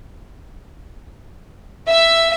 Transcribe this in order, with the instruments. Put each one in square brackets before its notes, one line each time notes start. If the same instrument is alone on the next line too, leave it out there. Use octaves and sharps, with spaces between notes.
[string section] E5